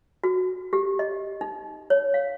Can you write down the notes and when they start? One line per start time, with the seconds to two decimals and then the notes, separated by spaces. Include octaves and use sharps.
0.24 F#4
0.73 G4
0.99 D#5
1.41 D#4
1.90 C#5
2.14 F5